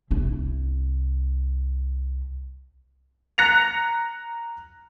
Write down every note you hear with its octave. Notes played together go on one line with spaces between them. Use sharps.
C2 E4
A#5 F#6 A#6 C#7 F7